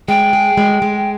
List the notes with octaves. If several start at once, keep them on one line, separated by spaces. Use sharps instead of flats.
G#3 G5
G#4
G#3
G#3